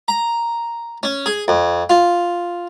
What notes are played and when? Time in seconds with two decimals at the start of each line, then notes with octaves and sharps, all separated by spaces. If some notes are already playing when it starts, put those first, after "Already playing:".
0.08 A#5
1.03 C#4
1.26 G#4
1.48 F2
1.90 F4